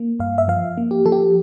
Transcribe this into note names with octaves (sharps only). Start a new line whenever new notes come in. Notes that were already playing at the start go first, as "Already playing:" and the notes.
Already playing: A#3
G2 F5
E5
F3 F5
A#3
G4
F3 A4
G4